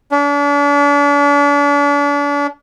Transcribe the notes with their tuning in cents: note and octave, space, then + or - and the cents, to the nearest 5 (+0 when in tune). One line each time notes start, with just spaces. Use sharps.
D4 -40